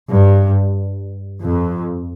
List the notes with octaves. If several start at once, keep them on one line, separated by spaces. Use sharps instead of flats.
G2
F2